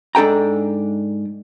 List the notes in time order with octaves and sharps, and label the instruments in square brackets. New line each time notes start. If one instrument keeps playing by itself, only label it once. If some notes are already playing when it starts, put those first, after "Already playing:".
[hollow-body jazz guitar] G#2 D4 A4 G5 A#5